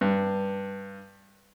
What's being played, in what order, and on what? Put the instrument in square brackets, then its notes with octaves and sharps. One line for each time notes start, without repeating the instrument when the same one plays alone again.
[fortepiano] G2